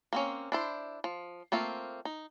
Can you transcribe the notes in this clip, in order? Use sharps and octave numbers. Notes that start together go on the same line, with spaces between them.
A#3 C4 C#4
D4 E4 C5
F3
A3 A#3 C4 F4
D#4